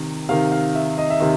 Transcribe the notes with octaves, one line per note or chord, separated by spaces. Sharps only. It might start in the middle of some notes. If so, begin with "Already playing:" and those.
Already playing: C3 D#3
C3 D#3 F5
F5
E5
D#5
E5
C3 D#3